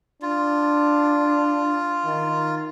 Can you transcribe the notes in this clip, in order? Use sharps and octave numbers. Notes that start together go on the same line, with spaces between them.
D4 F4
D#3